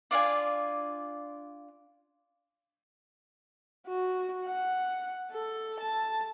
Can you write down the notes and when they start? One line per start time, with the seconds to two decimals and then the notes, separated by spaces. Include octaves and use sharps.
0.11 D4 F4 D5 G#5
3.88 F#4
4.46 F#5
5.32 A4
5.80 A5